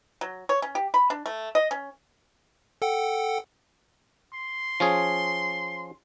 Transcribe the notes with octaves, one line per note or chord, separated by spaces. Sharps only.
F#3
C#5
C#4
G4
B5
D4
A3
D#5
C#4
A4 F#5 G5
C6
F3 C#4 G#4